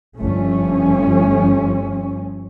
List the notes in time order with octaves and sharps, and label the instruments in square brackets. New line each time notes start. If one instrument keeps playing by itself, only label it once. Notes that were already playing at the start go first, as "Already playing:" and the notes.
[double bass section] G1 F3 A3 C#4